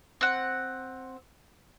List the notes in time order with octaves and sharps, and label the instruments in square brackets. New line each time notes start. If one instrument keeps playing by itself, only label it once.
[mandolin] C4 F#5